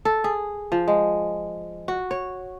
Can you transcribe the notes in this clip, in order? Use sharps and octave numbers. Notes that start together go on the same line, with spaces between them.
A4
G#4
F3
G#3
F#4
C#5